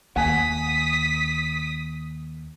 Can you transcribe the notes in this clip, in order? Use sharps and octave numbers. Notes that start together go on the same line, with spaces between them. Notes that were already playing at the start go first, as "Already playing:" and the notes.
D#2 F#5 G#5 D#6 B6